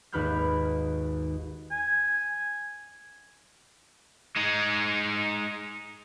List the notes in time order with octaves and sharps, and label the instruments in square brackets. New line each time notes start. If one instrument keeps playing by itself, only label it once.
[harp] G#1 D#2 B4 B5 F6 G6
[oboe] G#5
[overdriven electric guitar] G#3 D#4